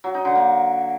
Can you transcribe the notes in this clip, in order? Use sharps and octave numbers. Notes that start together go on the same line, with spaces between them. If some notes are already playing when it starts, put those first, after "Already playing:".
F#3
D#4
D3
A#3